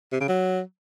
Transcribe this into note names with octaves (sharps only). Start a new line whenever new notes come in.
C3
C#3
F#3